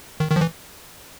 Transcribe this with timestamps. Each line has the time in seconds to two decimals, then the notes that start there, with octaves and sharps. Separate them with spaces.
0.20 D#3
0.31 D#3 F3
0.41 E3